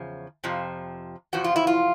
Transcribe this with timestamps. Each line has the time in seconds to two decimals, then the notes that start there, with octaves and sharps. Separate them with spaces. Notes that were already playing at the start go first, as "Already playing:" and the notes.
Already playing: E2 C#3 F3
0.44 F2 C3 F3
1.33 E2 C3 F3 F#4
1.44 F4
1.56 E4
1.67 F4